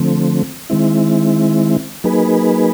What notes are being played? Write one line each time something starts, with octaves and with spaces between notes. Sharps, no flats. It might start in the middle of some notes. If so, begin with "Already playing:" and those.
Already playing: D3 F3 A3 C4
D#3 G#3 C4 E4
F#3 A#3 D#4 G#4 B4